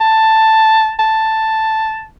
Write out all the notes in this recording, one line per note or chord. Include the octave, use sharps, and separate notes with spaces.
A5
A5